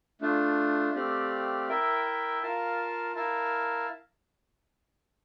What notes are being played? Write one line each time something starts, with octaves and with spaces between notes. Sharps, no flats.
A3 D4 F4
A3 C4 G4 D5 F5
E4 A#4 E5 G5
F4 A#4 F5 A5
E4 A#4 F5 A5